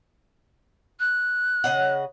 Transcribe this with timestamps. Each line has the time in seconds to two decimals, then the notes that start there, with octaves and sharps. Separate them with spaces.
1.00 F#6
1.64 C#3 D#5 F#5